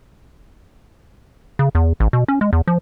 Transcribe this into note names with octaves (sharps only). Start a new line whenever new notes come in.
C#3
E2
A1
B2
C#4
G#3
E2
F3